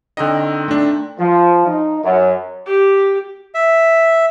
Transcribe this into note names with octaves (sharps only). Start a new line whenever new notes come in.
D3 D#3 C4 D#5
A3 D4
F3
D#4
F#2
G4
E5